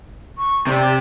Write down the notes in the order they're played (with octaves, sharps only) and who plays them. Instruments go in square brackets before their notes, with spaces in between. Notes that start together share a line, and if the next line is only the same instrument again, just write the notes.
[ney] C#6
[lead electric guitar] C3 [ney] D5